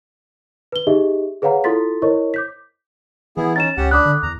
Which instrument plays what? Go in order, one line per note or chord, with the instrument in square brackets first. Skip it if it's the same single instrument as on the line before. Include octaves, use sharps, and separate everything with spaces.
[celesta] B4 G7
D#4 G4 G#4 D#5 E5
G#4 B4 C#5 F5 F#5 A#5
E4 F4 A4 C6 A6 B6
E4 A#4 C5 C#5 D#5 C#6
D6 G6 B6
[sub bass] E3 [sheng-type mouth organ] B3 E4 G#4
[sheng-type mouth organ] C#4 D#4 [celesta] A6 E7
[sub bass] C#2 [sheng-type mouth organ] C#4 G4 F#5
[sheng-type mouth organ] D4 B5 [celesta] D6 D#6 F#6
[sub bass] D3
[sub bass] E2 [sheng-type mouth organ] A#5